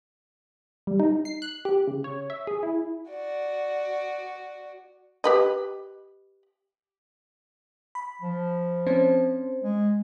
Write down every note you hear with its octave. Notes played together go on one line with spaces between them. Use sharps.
G3
D#4
C7
F#6
G4
C#3
C#5
E5
G#4
E4
F#4 D5
G4 B4 D#5
B5
F3
C4 C#4 C5
G#3